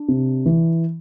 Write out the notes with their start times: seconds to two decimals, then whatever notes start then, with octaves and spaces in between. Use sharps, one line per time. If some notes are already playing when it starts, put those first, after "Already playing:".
Already playing: D4
0.08 C3
0.46 E3